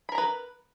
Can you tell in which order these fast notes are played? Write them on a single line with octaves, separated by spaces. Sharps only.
B5 A#4 A#5 B4